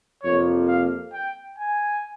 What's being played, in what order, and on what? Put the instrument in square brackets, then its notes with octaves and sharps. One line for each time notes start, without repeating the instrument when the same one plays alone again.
[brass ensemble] F2 C3 F3 A#3 [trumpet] C#5
[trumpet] F5
G5
G#5